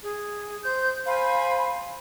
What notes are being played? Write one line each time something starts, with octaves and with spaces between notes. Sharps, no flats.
G#4
C5 G6
C5 F5 G#5 B5